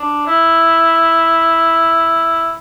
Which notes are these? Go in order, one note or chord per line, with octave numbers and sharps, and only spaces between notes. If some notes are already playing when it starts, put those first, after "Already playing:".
Already playing: D4
E4